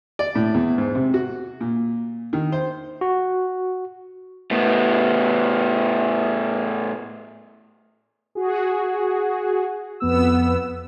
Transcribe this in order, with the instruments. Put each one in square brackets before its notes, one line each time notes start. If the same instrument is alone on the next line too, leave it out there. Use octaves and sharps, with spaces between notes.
[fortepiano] D5
A2
E2
G#2
C3
F#4
A#2
D#3
C5
[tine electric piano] F#4
[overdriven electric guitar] A2 B3
[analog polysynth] F#4 G#4
F2 B3 E6